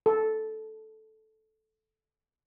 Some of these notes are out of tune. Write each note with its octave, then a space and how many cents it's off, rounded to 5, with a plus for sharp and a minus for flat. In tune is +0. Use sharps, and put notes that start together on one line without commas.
A4 -10